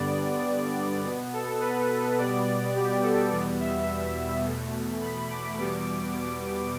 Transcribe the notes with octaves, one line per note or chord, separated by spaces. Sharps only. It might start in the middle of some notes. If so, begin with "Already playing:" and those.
Already playing: G2 D3 G3 B3 D5
B2 B3
A4
B4
B2 G3 B3 D5
G4
A4
E2 B2 G3 B3 D5
E5
E2 B2 A3
B5
D6
E2 B2 G3 B3 D6
D6